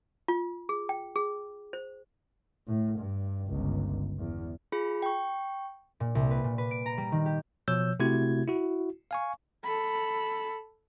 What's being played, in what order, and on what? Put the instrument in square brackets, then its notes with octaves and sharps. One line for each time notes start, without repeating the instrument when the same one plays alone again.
[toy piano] F4
G#4
G5
G#4
C5
[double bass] A2
G2
G1 C#2
E2
[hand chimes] F4 G#4 B5
G5 C#6
[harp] A#2
C2
B4
A#2
B4
D7
A#5
G3
D#3
G4
[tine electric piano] B2 F3 C#5 E6 G6
C3 A3 E4 F#4 G#6
E4 F#4
F5 G#5 C#6
[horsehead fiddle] A4 B5